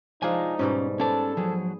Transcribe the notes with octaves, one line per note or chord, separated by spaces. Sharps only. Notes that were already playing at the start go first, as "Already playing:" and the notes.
F3 G#3 D4 D#4 F4 G#5
G#2 B2 G3 C#4
B3 C#4 A4 C5 D5 A5
F3 F#3 G#4